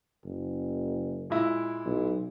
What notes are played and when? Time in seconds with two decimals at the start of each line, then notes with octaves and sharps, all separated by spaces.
0.24 F#1
1.30 A#2 G#3 E4
1.85 B1